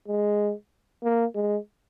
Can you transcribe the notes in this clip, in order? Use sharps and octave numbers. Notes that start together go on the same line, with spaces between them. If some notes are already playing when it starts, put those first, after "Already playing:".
G#3
A#3
G#3